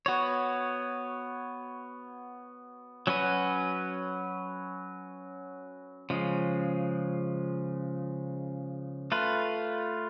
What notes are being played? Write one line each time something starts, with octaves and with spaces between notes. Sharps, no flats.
B3 F#4 C#5
F#3 C#4 F#4 B4
C#3 F3 G#3
A3 F4 B4